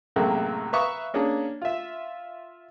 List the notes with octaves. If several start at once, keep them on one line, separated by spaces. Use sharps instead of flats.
F#2 A2 C3 G#3 A#3
B4 E5 F5 A#5 C#6 D#6
A#3 C#4 D4 G#4
F4 E5